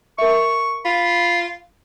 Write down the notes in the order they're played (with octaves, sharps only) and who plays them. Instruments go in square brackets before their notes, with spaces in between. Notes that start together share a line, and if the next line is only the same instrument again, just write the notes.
[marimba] A#4 E5 [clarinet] C#6
[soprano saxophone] F4 [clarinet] B5